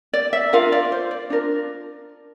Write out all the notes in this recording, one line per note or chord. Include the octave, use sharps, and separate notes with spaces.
D5
E5
D4 F4 A#4 F5
D5
C5
D5
D4 F4 A#4